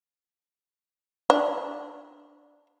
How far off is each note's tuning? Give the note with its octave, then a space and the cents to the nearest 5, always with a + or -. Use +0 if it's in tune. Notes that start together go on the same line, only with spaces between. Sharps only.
D4 +5